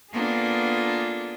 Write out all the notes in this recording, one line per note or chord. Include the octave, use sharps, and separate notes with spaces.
A#3 B3 D4 F4 G#4 A4